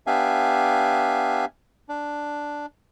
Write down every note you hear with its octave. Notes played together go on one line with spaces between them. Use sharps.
B3 D4 G4 E5 F5 G#5
D4